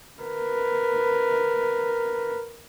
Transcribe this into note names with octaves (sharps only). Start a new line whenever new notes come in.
A#4 B4